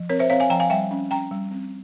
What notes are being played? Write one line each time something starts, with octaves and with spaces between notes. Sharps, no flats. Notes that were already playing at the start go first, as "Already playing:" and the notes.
Already playing: F3
C4 A#4 C#5
C5 E5
C4 C#5 F5
F5 G#5
F3 G5 A#5
F5 G#5
G3 E5 G5
C#4
C#4 G5 A#5
G3
C4